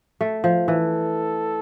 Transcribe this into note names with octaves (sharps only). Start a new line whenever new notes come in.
A3
F3
E3 A4